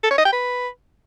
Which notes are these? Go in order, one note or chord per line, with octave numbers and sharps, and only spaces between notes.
A4
C#5
D#5
G5
B4